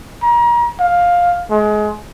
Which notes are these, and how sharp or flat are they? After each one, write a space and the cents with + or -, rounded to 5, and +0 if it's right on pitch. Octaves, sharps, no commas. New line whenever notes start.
A#5 +35
F5 +10
G#3 +25